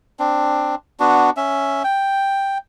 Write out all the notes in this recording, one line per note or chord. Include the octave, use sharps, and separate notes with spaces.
C4 D4
B3 D4 F#4
C#4 E5
G5